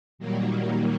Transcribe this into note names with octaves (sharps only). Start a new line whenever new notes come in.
A#2 D#3 F#3 G3 A#3